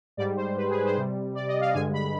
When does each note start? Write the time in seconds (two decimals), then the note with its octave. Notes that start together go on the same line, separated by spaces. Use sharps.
0.17 G#2 G3 D5
0.37 C5
0.57 B4
0.70 G#4
0.75 B4
0.86 C5
0.96 C3 G3
1.35 D5
1.47 D#5
1.60 F5
1.74 G2 D3 G#3 G#5
1.93 B5